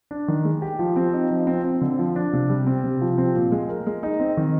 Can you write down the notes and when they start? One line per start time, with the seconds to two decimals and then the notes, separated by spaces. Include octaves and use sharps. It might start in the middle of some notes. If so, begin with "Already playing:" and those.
0.11 D4
0.28 D#3
0.45 G#3
0.62 G4
0.79 F3
0.96 C4
1.13 D#4
1.30 F3
1.47 C4
1.64 C4
1.81 D3
1.99 F3
2.16 D4
2.33 C3
2.50 G3
2.67 C4
2.84 C3
3.01 F3
3.18 C4
3.35 A#2
3.52 G#3
3.69 A#4
3.87 G#3
4.03 D#4
4.20 C4
4.37 D#3